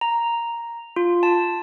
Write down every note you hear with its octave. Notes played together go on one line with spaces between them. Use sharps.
A#5
F4
A5